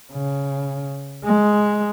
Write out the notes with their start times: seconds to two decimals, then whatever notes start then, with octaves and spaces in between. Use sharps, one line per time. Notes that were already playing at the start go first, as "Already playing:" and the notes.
0.13 C#3
1.25 G#3